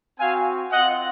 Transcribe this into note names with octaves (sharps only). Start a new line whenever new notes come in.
C4 F#4 F5 G#5
C4 F4 D#5 F#5